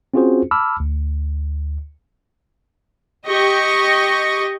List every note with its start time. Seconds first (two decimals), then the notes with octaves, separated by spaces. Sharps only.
0.14 C4 C#4 F4 F#4 G#4 C5
0.51 A5 B5 D6 E6 F6
0.80 D2
3.26 G4 D#5 C#6